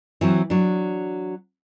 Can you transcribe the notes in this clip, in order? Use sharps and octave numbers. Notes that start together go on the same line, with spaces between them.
E3 F#3 C4
F#3 D4